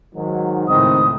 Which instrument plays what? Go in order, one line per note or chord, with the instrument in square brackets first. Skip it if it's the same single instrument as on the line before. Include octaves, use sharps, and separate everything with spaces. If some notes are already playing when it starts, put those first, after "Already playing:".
[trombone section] G#2 D#3 F#3
[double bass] C#2 A2 [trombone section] D#3 C4 D#4 [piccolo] D#6